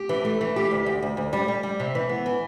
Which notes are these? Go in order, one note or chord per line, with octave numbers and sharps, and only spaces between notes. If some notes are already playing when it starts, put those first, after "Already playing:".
Already playing: G4
E3
A3
E3
G4
D2
D2
D2
D2
G3
G3
G3
C3
E3
B3
E3